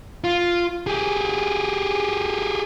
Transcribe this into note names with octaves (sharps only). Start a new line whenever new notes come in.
F4
G4 G#4